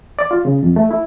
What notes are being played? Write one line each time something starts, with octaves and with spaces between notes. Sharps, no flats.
D5
F4
C#3
F2
A3
E4